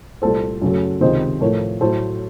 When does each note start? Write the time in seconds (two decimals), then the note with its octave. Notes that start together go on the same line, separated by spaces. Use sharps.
0.22 C2 A#2 A3 A4 C5
0.62 F#2 C#3 F#3 A3
1.01 C#2 C3 D#3 C5 D#5
1.40 A2 F3 A3 A#4 C#5
1.81 A2 F#3 A3 A4 C5